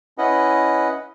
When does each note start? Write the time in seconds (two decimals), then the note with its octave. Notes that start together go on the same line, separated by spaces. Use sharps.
0.18 C#4 E4 B4 D#5 F#5